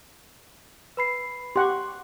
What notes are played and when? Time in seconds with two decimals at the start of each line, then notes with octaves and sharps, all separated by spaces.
0.97 B4 B5 C7
1.56 G4 F#5 C6 C#6